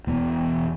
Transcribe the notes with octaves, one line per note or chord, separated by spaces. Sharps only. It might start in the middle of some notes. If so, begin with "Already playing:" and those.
E1 E2 B2 B3